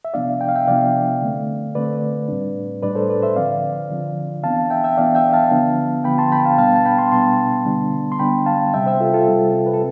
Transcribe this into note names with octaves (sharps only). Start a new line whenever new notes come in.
E5
C3 F3 B3 D4 D5 F5
G5
F5
E5 G5
C3 F3 B3 D4 D5 F5
D3 A3 C4
D3 A3 C4 B4 D5
A2 G3 D4
A2 G3 D4 B4 D5
A4 C5
B4 D5
C5 E5
D3 F3 C4 D5 F5
D3 F3 C4
E3 B3 D4 F5 A5
E5 G5
E5 G5
E3 B3 D4 D5 F5
E5 G5
F5 A5
D3 F3 B3 D4
D3 F3 B3 D4 G5 B5
A5 C6
G5 B5
F5 A5
B2 G3 B3 D4 F5 A5
A5
G5 B5
A5 C6
B2 G3 B3 D4 A5 C6
D3 G3 B3 D4
C6
D3 G3 B3 D4 G5 B5
F5 A5
C3 G3 C4 E5 G5
C5 E5
F4 A4
F4 A4
C3 G3 C4
B4
A4